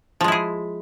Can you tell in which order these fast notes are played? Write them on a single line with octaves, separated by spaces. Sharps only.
F3 G#3 E4 G#4